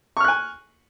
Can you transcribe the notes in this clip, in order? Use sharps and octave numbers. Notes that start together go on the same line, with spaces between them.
G#5 C#6 F6 F#6